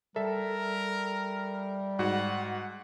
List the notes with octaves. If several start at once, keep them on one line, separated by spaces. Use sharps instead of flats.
G3 A4 A#4 E5 A5
G#2 F#4 F#5